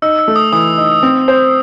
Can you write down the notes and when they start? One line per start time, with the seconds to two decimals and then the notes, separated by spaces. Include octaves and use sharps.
0.02 D#4 E6
0.19 E6
0.28 A3
0.36 D#6
0.52 E3 D#6
0.78 D#4
1.03 C4
1.28 C5